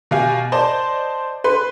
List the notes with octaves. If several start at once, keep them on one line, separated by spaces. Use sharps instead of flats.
B2 G4 F5 G#5
C5 D5 D#5 A5
B4 C6